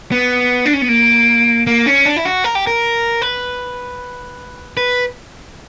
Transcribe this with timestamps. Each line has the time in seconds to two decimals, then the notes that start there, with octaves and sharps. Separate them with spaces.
0.12 B3
0.66 D4
0.74 C#4
0.82 B3
0.89 A#3
1.67 A#3
1.86 C#4
2.05 D4
2.16 E4
2.25 F#4
2.44 A#4
2.55 G4
2.67 A#4
3.22 B4
4.77 B4